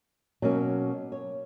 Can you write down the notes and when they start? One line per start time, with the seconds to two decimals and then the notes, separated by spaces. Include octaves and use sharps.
0.42 B2 F#3 A#3 C#4
1.12 C#5